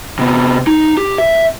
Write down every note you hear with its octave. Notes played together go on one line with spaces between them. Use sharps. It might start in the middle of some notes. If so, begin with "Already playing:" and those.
C3 B3
D#4
G4
E5